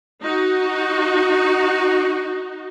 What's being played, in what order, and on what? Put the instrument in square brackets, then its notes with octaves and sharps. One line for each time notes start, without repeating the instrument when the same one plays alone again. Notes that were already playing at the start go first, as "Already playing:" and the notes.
[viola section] D#4 F#4